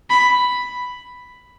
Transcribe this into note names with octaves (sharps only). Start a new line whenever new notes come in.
B5